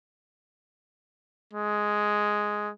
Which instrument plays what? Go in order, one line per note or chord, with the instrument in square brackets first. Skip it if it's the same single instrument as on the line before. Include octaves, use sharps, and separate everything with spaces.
[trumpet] G#3